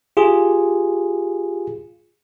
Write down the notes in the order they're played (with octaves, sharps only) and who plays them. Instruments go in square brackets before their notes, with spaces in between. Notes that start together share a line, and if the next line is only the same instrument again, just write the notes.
[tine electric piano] F4 G4 G#4